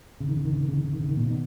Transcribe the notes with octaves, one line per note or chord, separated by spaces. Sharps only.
C#3
D#3
C#3
D#3
C#3
D#3
C#3
D#3
C#3
D#3
C#3
D#3
A#2 C#3
B2 D#3